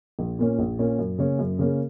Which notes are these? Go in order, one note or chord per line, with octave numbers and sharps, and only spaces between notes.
A#1
A#2 A#3 C#4
A#1
A#2 A#3 C#4
F#2
C#3 A#3 C#4 G#4
F#2
C#3 A#3 C#4 G#4